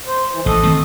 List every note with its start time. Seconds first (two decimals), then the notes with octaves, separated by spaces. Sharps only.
0.07 C5
0.31 E3
0.46 A1 A4 D#5
0.64 D#3 A3 C4